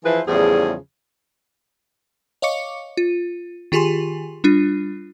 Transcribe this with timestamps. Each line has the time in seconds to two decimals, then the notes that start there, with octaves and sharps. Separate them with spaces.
0.05 E3 F3 E4 G#4 B4 C5
0.27 E2 A2 C#3 F3 G3 G#4
2.42 C#5 D#5 F5 C#6 D6 C#7
2.97 F4
3.72 D#3 F4 G4 G#4 G#5 C6
4.44 G3 D4 F4